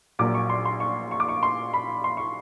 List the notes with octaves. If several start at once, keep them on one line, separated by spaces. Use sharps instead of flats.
A#1 A#2 F#3 A#3 D6
C#6
C6
C6
C#6
C#6
D6
C#6
C6
B5
C6
C#6